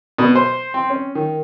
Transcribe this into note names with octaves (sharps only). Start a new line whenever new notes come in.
B2
C5
C4
C#4
D#3